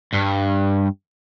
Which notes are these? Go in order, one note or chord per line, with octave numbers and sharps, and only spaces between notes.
G2